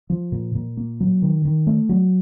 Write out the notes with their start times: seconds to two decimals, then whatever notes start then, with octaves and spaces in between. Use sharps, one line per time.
0.10 F3
0.32 A#2
0.55 A#2
0.77 A#3
1.00 F#3
1.22 D#3
1.45 D#3
1.67 A3
1.89 F#3